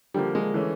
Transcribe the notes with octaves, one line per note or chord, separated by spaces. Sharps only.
D3 F3 G3 A#3
G#3
E3 A3 C#4